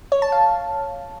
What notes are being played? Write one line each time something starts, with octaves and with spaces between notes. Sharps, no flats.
C#5
A5
F5